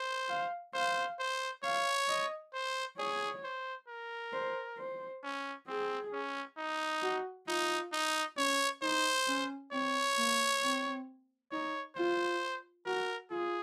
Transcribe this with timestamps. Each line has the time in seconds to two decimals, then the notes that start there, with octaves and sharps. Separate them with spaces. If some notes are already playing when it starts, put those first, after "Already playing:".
Already playing: C5
0.29 F5
0.74 C5 F5
1.19 C5
1.63 C#5 F5
2.08 D#5
2.54 C5
2.98 G#4 C#5
3.44 C5
3.88 A#4
4.33 C5
4.78 C5
5.24 C#4
5.68 C4 G#4
6.13 C#4
6.57 D#4
7.02 F#4
7.48 D#4 F4
7.93 D#4
8.37 C#4 C#5
8.83 D#4 C5
9.27 C#4
9.72 C4 C#5
10.17 A#3
10.62 C4
11.52 D#4 C#5
11.96 F4 C5
12.86 F#4 A#4
13.31 F4 G#4